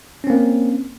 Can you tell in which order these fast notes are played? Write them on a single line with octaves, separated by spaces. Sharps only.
C#4 C4 A#3